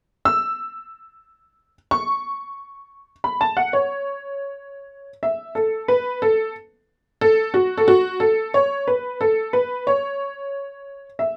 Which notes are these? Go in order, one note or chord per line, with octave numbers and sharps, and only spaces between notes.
E6
C#6
B5
A5
F#5
C#5
E5
A4
B4
A4
A4
F#4
A4
F#4
A4
C#5
B4
A4
B4
C#5
E5